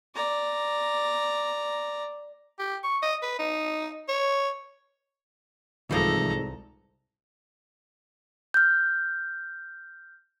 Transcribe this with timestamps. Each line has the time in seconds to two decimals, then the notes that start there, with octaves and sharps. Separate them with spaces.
0.15 D5 A#5
2.59 G4
2.84 C#6
3.02 D#5
3.23 B4
3.39 D#4
4.09 C#5
5.91 C2 G#2 E3 F3 A4 A#5
8.54 F6 G6